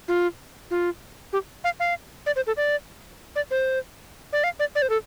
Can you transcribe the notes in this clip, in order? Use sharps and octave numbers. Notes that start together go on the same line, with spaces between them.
F4
F4
G4
F5
F5
D5
C5
A4
D5
D5
C5
D5
F5
D5
D5
C5
A4